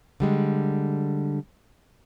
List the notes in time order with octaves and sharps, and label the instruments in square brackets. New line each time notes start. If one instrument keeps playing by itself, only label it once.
[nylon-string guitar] D3 G3 G#3